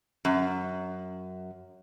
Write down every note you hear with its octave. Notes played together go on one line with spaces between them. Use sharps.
F#2